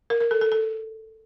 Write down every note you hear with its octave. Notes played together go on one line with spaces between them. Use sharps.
A#4
A#4
A4
A4
A4